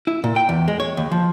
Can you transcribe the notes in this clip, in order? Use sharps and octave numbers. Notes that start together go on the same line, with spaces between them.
E4
A#2
G5
E2
G#3
C#5
D#2
F3